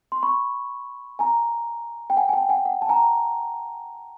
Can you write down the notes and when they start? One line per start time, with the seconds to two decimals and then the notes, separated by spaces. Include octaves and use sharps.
0.12 C6
0.23 B5 C#6
1.19 G#5 A#5
2.10 G5
2.17 F#5 G#5
2.29 G#5
2.33 G5 A5
2.49 F#5 G#5
2.65 F#5
2.82 A5
2.89 G#5 A#5